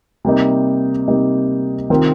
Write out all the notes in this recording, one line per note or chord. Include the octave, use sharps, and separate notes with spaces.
C3 G3 A#3 D#4
C3 G3 A#3 D#4
C3 D#3 C4 F4 A#4